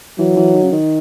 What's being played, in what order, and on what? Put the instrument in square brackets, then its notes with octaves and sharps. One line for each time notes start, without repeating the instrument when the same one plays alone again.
[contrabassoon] E3 [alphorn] F#3
[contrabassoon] E3
D#3
C#3
D#3